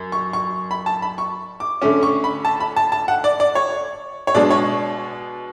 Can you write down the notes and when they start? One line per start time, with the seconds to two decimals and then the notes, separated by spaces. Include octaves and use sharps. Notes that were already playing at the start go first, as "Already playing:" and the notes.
Already playing: F#2
0.12 C#6
0.33 C#6
0.71 B5
0.86 A5
1.02 B5
1.18 C#6
1.60 D6
1.82 D3 A3 C#4 D6
2.03 C#6
2.24 B5
2.45 A5
2.60 B5
2.76 A5
2.92 A5
3.08 F#5
3.24 D5
3.40 D5
3.55 C#5
4.27 C#5
4.35 B2 G#3 D4 D5
4.50 C#5